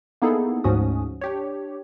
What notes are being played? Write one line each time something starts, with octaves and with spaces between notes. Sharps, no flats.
A#3 B3 D#4 E4 G#4 A4
D2 G#2 F3 C#4 F#4 D#6
D4 G4 C#5